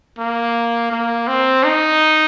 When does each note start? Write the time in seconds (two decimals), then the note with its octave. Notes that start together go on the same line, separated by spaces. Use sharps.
0.19 A#3
0.92 A#3
1.28 C4
1.64 D#4